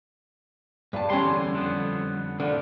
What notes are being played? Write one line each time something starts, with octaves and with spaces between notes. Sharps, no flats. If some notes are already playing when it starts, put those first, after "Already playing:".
G2 A5
E2 D3 G3 C#4 C6
F2 D3 B3
A2 D3 F3